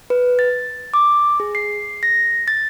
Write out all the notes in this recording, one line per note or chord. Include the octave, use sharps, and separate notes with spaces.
B4
A6
D6
G#4
C7
A#6
A6